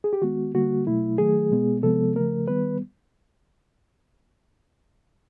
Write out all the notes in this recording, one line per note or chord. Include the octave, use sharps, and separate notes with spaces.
G#4
G4
D#3 G#3 B3 F#4
D3 G3 A#3 F#4
B2 F#3 A3 E4
D#3 F#3 A3 G#4
B2 G#3 B3
C3 F3 G#3 B3 A4
C#3 F3 A3 A#4
D#3 G3 B3 B4